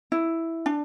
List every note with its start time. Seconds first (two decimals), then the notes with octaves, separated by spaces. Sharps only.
0.12 E4
0.66 D4